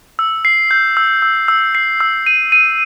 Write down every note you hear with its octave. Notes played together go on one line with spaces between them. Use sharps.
E6
C7
G6
E6
E6
E6
C7
E6
D#7
D#7